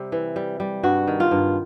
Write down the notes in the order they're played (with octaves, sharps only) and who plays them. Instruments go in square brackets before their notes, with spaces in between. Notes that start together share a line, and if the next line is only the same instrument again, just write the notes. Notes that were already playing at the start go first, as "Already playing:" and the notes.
Already playing: [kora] C3 G3
E3
G3
G3
G2 F#4
D#3
F4
G2